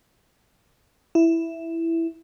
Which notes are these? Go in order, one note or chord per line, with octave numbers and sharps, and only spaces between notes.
E4